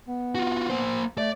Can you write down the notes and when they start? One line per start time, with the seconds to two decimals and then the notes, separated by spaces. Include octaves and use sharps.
0.08 B3
0.35 F4 F#4
0.69 A#3 C5
1.18 A3 D5